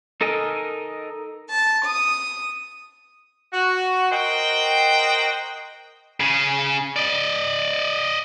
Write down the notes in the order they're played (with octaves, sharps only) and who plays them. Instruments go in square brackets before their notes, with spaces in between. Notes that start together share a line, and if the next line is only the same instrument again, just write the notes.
[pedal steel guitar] D#4 A4 A#4 D#5 G#5
[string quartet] A5
D#6
[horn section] F#4
F#4 A#4 C5 D#5 G5
[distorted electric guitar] C#3 G#4
D5 D#5